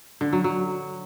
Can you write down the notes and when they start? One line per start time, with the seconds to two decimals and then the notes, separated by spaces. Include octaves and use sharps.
0.21 D3
0.33 F#3
0.44 F#3